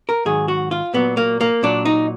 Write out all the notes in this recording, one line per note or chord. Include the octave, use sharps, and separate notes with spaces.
A#4
G#2 D#3 F#3 G#4
F#4
F4
A#2 F#3 B3
A#3
A#3
A#2 F#3 D4
D#4